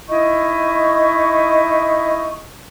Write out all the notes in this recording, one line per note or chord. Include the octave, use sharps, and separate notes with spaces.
D#4 E4 D#5 E5 C#6